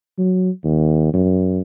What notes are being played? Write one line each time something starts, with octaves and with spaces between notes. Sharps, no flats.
F#3
D#2
F#2